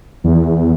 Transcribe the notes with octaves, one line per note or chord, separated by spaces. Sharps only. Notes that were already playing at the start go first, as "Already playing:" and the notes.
E2